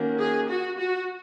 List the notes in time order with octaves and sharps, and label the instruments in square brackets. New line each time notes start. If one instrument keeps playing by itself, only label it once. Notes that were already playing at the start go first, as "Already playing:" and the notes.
Already playing: [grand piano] D#3 A#3 C#4 F#4
[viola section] G#4
F#4
F#4